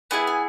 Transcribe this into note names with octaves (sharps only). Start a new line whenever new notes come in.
B3 E4 G#4 G#5
G#5